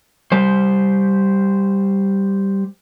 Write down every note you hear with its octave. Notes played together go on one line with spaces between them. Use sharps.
G3 C5